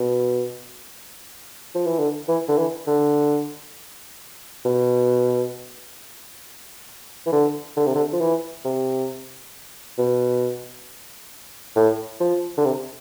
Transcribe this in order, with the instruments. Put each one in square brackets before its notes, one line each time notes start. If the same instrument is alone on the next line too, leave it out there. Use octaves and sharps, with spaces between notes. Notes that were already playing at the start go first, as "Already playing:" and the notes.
Already playing: [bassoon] B2
F3
E3
D3
E3
D3
E3
D3
B2
E3
D3
D3
C3
D3
F3
E3
C3
B2
A2
F3
D3
C3